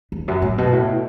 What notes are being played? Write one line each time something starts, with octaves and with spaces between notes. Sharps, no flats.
E2
F#2
A2
B2
A2